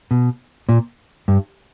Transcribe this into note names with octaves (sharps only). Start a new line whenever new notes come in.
B2
A#2
G2